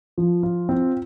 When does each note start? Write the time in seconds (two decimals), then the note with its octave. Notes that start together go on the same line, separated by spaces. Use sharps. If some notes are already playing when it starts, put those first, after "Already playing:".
0.18 F3
0.43 F4
0.69 C4